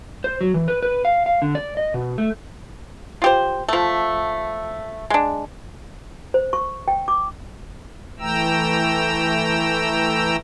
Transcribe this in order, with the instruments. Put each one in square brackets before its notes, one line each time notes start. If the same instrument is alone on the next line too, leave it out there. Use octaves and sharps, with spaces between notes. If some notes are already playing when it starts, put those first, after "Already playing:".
[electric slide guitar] C5
F#3
E3
B4
B4
F5
F5
D3
D5
D#5
B2
A3
[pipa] F4 G4 C5
F3 A3
G#3 D4
[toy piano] C5
C#6
G5
D6
[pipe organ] E3 A3 G5 A#5 E6